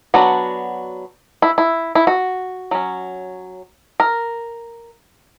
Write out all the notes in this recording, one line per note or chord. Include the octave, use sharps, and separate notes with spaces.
F#3 B3 D4 F#4
E4
E4
E4
F#4
F#3 C#4
A#4